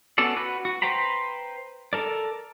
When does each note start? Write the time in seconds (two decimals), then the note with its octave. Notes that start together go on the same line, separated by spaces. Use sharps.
0.18 B3 C#4 F#4 A4 D5
0.36 F#4 B4
0.65 F#4
0.82 B4 C5 G5 A#5 B5
1.93 A4 A#4 D5